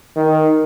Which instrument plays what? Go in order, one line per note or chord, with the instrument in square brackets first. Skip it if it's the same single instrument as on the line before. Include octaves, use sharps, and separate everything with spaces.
[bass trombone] D#3